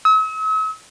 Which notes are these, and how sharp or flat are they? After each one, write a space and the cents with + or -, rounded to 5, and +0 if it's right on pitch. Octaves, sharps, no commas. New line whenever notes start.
E6 -45